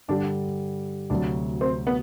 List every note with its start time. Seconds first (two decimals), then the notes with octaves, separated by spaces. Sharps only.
0.08 G2 D3 G3 D4
1.10 D2 C3 F#3 D4
1.61 C4
1.87 B3